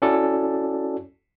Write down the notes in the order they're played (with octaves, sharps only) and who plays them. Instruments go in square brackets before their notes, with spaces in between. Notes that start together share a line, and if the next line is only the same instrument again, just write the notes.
[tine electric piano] C#4 E4 F#4 A4 D5